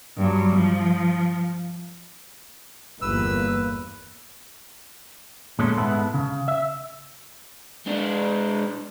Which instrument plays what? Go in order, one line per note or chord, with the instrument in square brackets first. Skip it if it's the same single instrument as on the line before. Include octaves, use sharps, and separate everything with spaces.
[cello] G2 F#3
F3
[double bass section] G1 E2 A#3 [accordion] B4 [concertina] E6
[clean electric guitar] A#2 G#3 C#4 A4 C6
G#2 G#3 B3 E4 A4 B5
C#3
E5
[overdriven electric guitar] G#3 D4